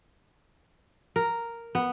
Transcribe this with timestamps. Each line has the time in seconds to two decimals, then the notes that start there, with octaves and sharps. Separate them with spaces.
1.16 A#4
1.75 B3